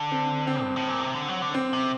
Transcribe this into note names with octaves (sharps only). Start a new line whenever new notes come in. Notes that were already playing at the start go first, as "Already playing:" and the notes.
Already playing: D3
C4
C4
G2
A2
A#2
C3
D3
F#3
D3
C4
C3